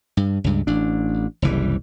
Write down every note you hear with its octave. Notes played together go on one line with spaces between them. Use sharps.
G2
C#2 G2
A1 D4
F#1 C2 E3 G3